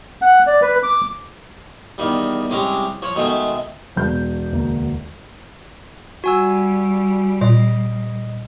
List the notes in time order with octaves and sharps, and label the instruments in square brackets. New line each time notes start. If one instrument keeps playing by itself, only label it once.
[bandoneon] F#5
D5
B4
D6
[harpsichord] E2 D#3 G3
C2 G#3 C#4 G4 A#5
F3 C#5
B2 D#3 G#3 A3
[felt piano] E1 G6
[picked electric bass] D2 A#3
[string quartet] G3 [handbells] F#4 G#5 E6
[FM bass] A#2 [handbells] D#5